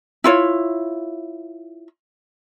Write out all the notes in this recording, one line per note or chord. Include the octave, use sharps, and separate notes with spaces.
E4 F4 C#5